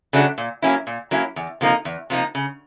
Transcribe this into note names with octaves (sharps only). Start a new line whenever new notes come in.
C#3 F#3 A3 D4
A#2
F#3 A#3 C#4 E4
A#2
F#3 A#3 C#4 E4
E2
C3 F3 A#3 D#4
E2
C3 F3 A#3 D#4
C#3